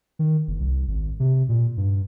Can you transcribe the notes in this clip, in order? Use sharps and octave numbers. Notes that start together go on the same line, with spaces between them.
D#3
F#1
C2
G#1
C3
A#2
G2